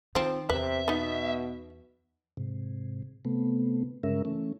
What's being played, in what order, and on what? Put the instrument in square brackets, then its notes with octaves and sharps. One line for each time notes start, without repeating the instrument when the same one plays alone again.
[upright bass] D#3 [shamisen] F3 C4
[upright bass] E2 [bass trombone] C3 [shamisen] B4 [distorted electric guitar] E5
[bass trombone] B2 [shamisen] B3 D#4
[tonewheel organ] G#2 C3
C3 A3 B3
G2 C#3 G#3 C#4 A#4 E5
E3 A3 C#4